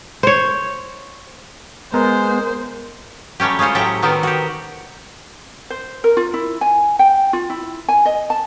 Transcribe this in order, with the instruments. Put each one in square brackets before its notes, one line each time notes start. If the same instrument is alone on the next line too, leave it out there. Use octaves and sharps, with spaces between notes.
[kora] C5 C#5
[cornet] G#3 [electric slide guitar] B3 [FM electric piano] A#4 [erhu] C5
[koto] F#3 G3 A3 C#4 G4
G#3 C#4 F4 C5 C#5
A2 F#3 G4 A4 E5 A#5
D#3 F#3 B3 C4 A4 A#4
F#4 G4
[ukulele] C5
A#4
F4
E4
G#5
G5
F4
E4
G#5
D#5
A5